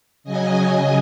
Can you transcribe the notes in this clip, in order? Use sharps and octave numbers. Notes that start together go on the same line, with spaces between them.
C#3 F#3 D#5 G#5